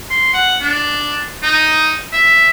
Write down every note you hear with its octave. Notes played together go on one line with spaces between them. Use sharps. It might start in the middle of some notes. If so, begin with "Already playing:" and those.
C6
F#5
D4
D#4
E5